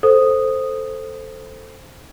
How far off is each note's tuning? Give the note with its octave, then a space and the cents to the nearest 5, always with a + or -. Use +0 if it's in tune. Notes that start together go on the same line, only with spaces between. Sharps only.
A4 +0 C5 +0 D#6 -5